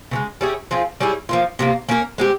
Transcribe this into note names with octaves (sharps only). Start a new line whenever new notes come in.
C#3 E3 G#3
G3 C#4 E4 G#4
F3 C4 F4 G#4
G3 C#4 E4 G#4
F3 A#3 F4
C3 F3 A#3
A#3 C#4 G4 A#4
G#3 C4 G4